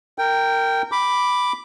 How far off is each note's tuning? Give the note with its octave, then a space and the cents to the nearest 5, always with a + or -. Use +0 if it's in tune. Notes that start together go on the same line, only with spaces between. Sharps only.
A#4 -20 G5 +0
B5 +0 D6 +0